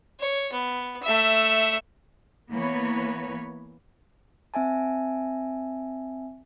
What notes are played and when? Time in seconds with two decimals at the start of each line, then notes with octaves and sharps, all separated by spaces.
0.20 C#5
0.53 B3
1.03 A3 E5
2.53 E3 A#3 B3 B4 C#5
4.54 C4 E5 G#5 A5